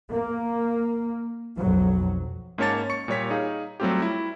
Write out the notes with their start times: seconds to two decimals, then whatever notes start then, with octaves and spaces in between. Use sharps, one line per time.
0.12 A#3
1.56 B1 F2 F#3
2.58 G#2 A#3 C#4 C#5 A5 A6
2.90 C#6 C#7
3.08 A#2 G3 C#5 B6
3.30 D#4 G#4 F5
3.80 F#3 G3 A3 C4 F4 G4
4.02 E4